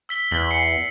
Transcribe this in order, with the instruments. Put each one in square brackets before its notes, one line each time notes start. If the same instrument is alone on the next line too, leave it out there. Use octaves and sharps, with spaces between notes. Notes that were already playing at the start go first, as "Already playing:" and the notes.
[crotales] E6 B6 G7
[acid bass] E2 [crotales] F#7 G7
[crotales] C7 C#7